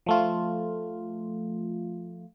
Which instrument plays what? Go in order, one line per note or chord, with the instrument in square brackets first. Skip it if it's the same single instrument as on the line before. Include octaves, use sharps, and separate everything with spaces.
[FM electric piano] F3 A3 F4